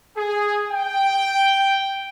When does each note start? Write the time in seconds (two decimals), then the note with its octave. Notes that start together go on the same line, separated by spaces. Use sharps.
0.16 G#4
0.72 G5